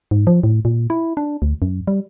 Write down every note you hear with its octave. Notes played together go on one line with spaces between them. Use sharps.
G#2
F3
A2
A#2
E4
D4
D2
F#2
G3